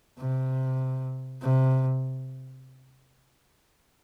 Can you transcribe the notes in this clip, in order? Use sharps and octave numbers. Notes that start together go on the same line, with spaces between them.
C3
C3